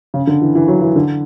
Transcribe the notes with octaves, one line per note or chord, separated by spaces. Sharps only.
C#3
D3
E3
E3
F#3
E3
D3